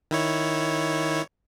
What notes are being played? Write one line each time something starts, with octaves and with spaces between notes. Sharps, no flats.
D#3 E4 C#5